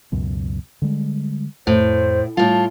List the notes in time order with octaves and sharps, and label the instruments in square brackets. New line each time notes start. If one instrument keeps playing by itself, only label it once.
[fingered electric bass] C#2 F#2 B2
D3 G3 G#3
[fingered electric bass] F2 [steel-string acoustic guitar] A2 [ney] C5
[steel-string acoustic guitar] A2 F4 [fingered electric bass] G3 [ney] A5